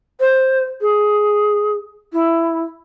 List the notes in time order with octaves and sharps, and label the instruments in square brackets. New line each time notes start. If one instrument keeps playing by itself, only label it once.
[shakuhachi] C5
G#4
E4